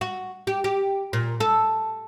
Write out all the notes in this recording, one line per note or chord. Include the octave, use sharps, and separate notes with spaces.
F#4
G4
G4
A#2
A4